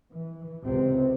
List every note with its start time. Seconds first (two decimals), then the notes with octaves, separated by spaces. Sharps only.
0.15 E3
0.62 C#2 C3 C4